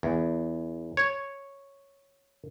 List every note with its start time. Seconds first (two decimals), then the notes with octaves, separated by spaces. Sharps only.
0.03 E2
0.97 C#5